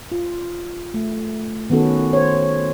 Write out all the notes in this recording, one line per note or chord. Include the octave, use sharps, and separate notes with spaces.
F4
A3
D#3 B3 C#4 F#4 A4
C5 C#5